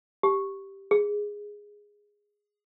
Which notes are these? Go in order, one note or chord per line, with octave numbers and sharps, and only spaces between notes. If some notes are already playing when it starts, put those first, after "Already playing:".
G4
G#4